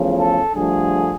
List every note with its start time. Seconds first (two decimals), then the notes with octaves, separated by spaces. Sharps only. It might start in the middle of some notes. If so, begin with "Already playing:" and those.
Already playing: E2 C#3 F3 A3
0.17 A4
0.55 G2 D3 F3 A3 G#4